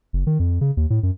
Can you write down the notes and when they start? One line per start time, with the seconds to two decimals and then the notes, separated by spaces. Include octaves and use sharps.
0.13 F#1
0.27 D#3
0.39 F2
0.61 C#3
0.77 D#2
0.90 A2
1.03 F#2